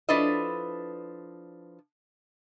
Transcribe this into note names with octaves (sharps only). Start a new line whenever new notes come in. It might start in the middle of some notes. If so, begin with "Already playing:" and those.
F3 D4 E4 A4 B4 D#5